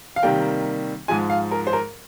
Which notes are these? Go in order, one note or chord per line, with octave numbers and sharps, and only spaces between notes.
F5
C3 D#3 G3 A#3 G5
G#2 F3 G#3 G#5
F5
A#4
C5
A#4